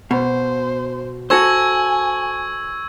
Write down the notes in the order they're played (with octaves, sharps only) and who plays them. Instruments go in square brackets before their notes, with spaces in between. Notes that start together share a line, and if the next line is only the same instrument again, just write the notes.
[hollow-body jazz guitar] B2 [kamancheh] C5
[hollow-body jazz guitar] F#4 A4 C5 [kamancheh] G#5 [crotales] C#6 E6 G#6